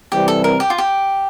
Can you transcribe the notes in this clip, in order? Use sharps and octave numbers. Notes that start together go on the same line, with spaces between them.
C3 E3 G3 C4 G4
A4
A#4
G4
F4
G4